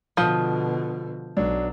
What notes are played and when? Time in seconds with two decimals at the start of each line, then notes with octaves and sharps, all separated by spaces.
0.17 B2 D3 F3 D#6 G6
1.37 B1 F#3 D4